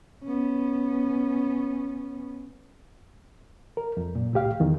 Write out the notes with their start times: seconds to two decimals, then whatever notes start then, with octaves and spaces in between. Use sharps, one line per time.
0.24 B3 C#4
3.77 A#4
3.97 F2
4.15 F#2 A#2
4.33 C2 A2 G4 F5
4.60 E2 D#3